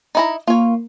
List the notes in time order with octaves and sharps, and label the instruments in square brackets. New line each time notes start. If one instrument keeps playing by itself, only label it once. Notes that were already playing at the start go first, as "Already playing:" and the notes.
[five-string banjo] D#4 E4 A#5
[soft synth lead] A#3 [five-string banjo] F4 C#5